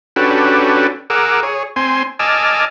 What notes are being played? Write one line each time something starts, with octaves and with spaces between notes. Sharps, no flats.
C#4 D4 F#4 G4 A4 B4
G#4 A#4 F#5 D6 E6
G#4 C#5
C4 G#5 C6
D#5 G#5 A5 D6 E6 F6